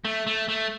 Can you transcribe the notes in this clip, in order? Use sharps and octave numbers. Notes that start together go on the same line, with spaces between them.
A3
A3
A3